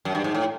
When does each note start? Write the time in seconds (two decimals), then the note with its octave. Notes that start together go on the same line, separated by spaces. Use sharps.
0.05 F#2
0.15 G2
0.24 G#2
0.35 A2